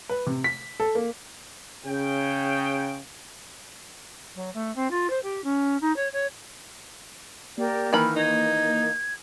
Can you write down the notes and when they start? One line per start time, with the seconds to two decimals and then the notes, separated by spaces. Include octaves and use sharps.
0.09 B4
0.26 C3
0.44 B6
0.80 A4
0.95 A#3
1.85 C#3 G5
4.35 F#3
4.54 A3
4.75 C4
4.90 F4
5.10 C5
5.23 G4
5.44 C#4
5.81 D#4
5.96 C#5
6.13 C#5
7.58 A#3 G4 A#4 D5
7.93 D#3 E3 B5 F6
8.16 D#4 G#6